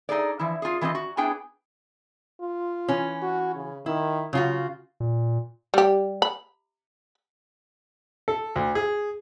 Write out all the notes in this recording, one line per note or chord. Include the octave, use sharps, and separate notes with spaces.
D#4 G#4 A4 D5
E3 F3 E4
F4 G#4
E3 A3 C4 F4 D#5
F#4
B3 D4 E4 G#4 G5 G#5
F4
E3 C#4
F#4
C#3
D#3 E4
C#3 F#3 F4 F#4
A#2
G3 G4
B5
A4
D2
G#4